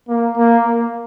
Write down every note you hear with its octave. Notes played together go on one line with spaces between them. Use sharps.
A#3
A#3
A#3